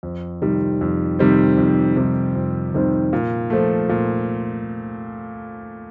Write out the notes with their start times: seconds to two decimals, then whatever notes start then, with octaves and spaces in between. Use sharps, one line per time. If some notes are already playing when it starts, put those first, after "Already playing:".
0.03 F2
0.42 C3 D#3 G3 C4
0.81 F2
1.19 C3 D#3 G3 C4
1.57 F2
1.96 C3 D#3 G3 C4
2.35 F2
2.74 C3 D#3 G3 C4
3.13 A#2
3.50 F3 A3
3.89 A#2